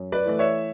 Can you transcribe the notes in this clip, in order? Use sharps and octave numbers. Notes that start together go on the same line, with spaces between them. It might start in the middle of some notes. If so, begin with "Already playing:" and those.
Already playing: F#2
B4 D5
E3 A3 D5
C#5 E5